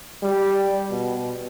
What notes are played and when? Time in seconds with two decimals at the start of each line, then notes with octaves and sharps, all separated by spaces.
0.23 G3
0.91 B2